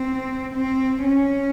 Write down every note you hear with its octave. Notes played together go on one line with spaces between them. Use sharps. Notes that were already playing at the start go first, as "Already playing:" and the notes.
Already playing: C4
C4
C#4